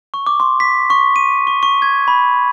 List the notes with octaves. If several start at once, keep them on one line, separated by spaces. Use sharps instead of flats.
C#6
D6
C6
B6
C#6
D#7
C#6
C#6
G#6
B5